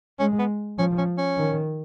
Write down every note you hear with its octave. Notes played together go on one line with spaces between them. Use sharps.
G#3 C#4
B3
F3 C#4
C#4
C#4
D#3